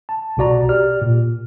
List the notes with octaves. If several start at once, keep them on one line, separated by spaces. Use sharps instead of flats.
A5
B1 B2 F#4 D5 A#5
G4 D5 F6
A#2